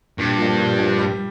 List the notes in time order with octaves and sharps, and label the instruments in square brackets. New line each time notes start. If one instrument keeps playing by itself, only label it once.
[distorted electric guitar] G2 [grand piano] A#2
[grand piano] F3 A#3 D4
A#2
F3 A#3 D4
G3